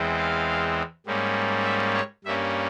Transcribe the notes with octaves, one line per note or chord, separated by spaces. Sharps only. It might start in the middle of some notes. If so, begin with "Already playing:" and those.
Already playing: E2 E3 G#3 C4
F5
G#2 G3 A#3 C#4
E5
C#5
G2 G3 A#3 C#4 E5